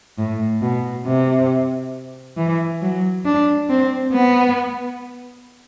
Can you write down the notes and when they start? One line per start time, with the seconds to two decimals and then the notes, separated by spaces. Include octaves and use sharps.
0.18 A2
0.62 B2
1.06 C3
2.37 E3
2.82 F#3
3.25 D4
3.69 C4
4.13 B3